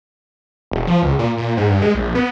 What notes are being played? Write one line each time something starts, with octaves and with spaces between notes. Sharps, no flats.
E1
F3
C#2
A#2
A#2
G#2
G2
G#3
A#1
B3